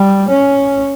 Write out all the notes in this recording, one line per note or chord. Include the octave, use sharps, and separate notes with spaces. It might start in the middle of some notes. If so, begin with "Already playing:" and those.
Already playing: G3
C#4